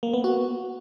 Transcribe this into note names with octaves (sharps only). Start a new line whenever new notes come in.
A#3
B3
F#4